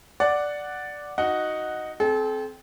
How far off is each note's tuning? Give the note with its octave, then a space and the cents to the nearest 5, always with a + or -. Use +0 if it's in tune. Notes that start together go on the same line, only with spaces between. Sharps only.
D5 +0 F#5 +0
D#4 +0 F#4 +0 F#5 +0
C4 +0 A4 -40